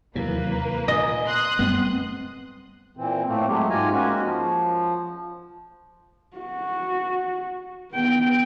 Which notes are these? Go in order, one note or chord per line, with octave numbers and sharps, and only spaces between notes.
D#2 C3 E3 F#3 A#3 B4
A#2 D#5 G#5
C6 D#6 F#6
F#2 G3 A3 B3 C4
A#2 E3 C4
A2 A3 A#3 C4
F#3 G#3 A3 G4
G#2 F4 G4 G#5 A#5
G#3 A#3 C#4 F#4
F3
F#4
B3 G5